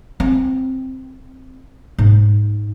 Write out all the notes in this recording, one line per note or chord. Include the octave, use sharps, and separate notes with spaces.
C4
G#2